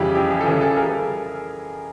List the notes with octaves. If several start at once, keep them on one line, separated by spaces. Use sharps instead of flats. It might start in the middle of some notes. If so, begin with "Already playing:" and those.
Already playing: F2 C#3 E3 G3 G4
F2 G4
G#4
A4
C#3 E3 G3 G#4
G4 A4
G#4 A#4